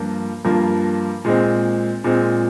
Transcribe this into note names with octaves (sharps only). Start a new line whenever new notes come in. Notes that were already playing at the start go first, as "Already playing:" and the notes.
Already playing: G2 F3 A#3 F4
G2 F3 A#3 F4
A#2 G#3 C4
A#2 G#3 C4